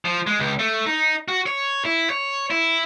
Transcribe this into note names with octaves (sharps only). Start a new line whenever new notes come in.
F3
G#3
C#2
A3
D#4
F#4
C#5
E4
C#5
E4